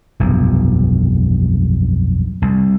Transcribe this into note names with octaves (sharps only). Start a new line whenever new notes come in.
F1 B1 G2
C2